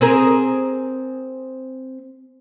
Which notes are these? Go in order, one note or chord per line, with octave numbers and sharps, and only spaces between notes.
C4 G#4 A#4